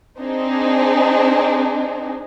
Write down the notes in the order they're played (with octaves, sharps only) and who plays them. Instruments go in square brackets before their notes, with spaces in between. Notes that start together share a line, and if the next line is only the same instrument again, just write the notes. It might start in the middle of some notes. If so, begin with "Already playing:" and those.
[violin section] C4 D4 D#4 G#4